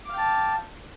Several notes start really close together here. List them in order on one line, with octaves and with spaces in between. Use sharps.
D6 F5 G5 A5